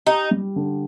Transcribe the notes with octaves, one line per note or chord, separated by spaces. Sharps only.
D#4 G4
G3
D3